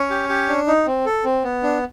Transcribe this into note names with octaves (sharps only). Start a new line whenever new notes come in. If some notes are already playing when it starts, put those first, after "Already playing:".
Already playing: C#4 C#5
G4
G4
D4
D#4
C4
A4
C4
B3
D4